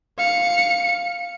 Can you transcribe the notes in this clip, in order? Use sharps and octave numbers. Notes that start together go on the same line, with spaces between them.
F5 C#7